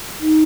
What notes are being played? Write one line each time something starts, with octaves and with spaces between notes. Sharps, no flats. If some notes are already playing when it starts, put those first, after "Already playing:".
D#4